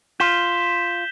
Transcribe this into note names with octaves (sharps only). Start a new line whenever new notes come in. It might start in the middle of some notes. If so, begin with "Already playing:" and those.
F4 G6 B6 E7 G7